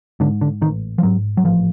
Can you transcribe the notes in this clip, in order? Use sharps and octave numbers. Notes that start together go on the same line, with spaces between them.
G#2 D3
D3
A1 D#3
F3
G#2 F#3
F#3
A1 F3